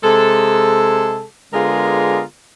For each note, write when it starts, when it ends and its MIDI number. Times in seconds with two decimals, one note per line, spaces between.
0.03 1.25 48
0.03 1.25 56
0.03 1.25 68
0.03 1.25 69
1.53 2.22 50
1.53 2.22 56
1.53 2.22 59
1.53 2.22 65
1.53 2.22 68
1.53 2.22 70